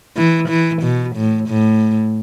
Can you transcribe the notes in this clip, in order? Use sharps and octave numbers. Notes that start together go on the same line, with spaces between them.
E3
E3
B2
A2
A2